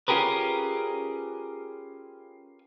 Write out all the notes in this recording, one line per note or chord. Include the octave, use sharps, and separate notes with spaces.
C#4 F4 G4 G#4 A#4 B4